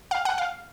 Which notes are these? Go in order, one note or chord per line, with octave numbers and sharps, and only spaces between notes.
F5
F#5
F5